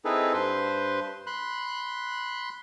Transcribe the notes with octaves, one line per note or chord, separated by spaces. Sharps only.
C4 D#4 E4 G#4 A4 B4
G2 B4 C5 C6
B5 C6 F#6